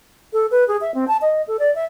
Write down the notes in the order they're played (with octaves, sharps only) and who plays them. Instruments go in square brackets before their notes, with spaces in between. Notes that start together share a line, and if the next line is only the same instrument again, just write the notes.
[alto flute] A4
B4
G#4
E5
C4
A5
D#5
A4
D5
E5